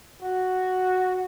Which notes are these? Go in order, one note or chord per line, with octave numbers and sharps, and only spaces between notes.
F#4